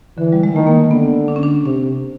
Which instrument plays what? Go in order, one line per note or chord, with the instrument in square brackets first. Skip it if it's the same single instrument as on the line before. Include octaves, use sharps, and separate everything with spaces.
[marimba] D3 [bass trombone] E3
[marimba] G3
G#3
[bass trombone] D#3 [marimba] A3
[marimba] A#3
[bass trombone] D3 [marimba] B3
[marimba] D4
C#4
D4
[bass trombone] C3 [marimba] C#4